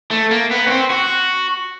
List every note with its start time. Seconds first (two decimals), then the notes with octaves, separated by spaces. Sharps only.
0.11 A3
0.31 A#3
0.51 B3
0.67 C#4
0.70 C4
0.90 F#4